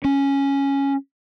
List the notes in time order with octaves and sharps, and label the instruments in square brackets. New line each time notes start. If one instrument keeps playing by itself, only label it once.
[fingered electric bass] C#4